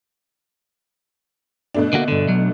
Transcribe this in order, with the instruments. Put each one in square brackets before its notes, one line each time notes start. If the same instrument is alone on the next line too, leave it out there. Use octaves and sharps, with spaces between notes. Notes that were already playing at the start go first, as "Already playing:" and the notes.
[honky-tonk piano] B2 A3 D4
[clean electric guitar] D3 A#3 F#4
G2 D3
B1 F#3